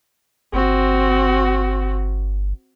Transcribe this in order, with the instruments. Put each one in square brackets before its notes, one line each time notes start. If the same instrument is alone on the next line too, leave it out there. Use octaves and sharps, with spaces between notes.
[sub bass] G1 [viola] C4 F#4